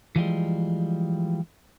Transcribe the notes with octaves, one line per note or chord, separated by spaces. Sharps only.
E3 F3 G3 G#3